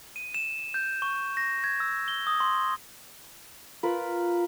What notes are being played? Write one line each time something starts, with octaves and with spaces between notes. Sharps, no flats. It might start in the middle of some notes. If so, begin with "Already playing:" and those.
D#7
E7
G6
C#6
A#6
G#6
E6
G7
D#6
C6
F4 A#4 B4